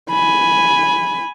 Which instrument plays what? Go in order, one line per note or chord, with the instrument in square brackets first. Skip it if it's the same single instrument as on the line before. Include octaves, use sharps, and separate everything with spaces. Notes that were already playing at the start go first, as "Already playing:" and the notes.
[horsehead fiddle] G#5 B5